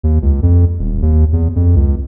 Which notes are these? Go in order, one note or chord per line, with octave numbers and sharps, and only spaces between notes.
D#2
C#2
F2
D#1
D#2
E2
F2
C#2